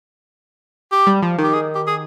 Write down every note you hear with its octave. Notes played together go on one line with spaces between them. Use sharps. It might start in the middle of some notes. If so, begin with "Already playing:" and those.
G4
G3
F3
D#3 G4
G#4
G4
G#4